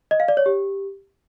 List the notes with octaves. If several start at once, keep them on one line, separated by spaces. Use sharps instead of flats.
D#5
F5
D5
C#5
G4